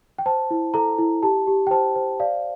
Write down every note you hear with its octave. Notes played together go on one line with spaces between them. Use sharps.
G5
C5 A5
E4
A4 A#5
E4
G4 A5
G4
G5
C5 A5
C5
D5 F5